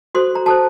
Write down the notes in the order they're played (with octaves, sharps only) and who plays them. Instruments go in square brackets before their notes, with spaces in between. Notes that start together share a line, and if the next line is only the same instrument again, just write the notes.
[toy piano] F#4 A4 C5 C6
A#5
F#4 A4 C5 A5